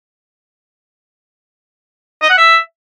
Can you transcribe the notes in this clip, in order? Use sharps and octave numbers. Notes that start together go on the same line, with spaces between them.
D#5
F#5
E5